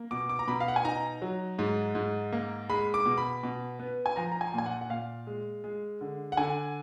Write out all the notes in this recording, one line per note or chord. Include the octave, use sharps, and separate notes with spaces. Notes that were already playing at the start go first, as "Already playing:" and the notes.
Already playing: A#3
B2 D6
D6
A#5
B2 B5
F5
F#5
G#5
D#4 A#5
F#3
G#2
G#2
A#3
G#3 B5
D6
B2
B5
B2
B3
G#5
F3 A#5
A#5
G#5
A#2 G#5
F#5
F#5
A#2 F5
G#3
G#3
D3
F#5
D3 G#5